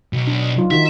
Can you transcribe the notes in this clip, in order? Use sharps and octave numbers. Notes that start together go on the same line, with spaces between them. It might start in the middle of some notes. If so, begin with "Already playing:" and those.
B1
D4
D#4 F4
D#3 D#4 F#4 E5